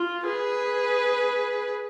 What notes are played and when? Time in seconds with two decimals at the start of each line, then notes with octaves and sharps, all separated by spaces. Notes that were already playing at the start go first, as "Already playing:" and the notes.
Already playing: F4
0.27 G#4 B4